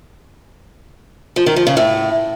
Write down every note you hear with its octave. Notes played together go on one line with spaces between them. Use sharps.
F3
D#3
F3
C#3
A2